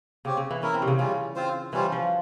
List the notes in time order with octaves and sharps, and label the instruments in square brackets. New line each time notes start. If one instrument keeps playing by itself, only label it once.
[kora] C#3 [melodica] C4 G4 C#5
[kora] C#3
E3
[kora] C#4 [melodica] E4 A#4 E5
[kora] C4
C3
C#3
[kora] C#3 [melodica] G3 C#4 F4
[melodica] C4 F4 C5
[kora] E3 [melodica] G3 C#4 F4 C5
[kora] F3